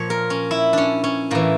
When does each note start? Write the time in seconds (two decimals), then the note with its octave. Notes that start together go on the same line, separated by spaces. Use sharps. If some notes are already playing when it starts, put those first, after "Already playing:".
Already playing: A#2 F3 C#5
0.10 A#4
0.30 C#4
0.51 E4
0.73 C#4 D4
1.04 C#4
1.31 A2 E3 A#3